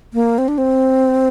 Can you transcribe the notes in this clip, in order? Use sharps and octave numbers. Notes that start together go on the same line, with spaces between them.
A#3
C4
D4
C4